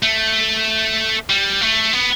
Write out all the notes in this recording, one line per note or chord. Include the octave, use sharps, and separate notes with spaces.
A3
G3
A3
B3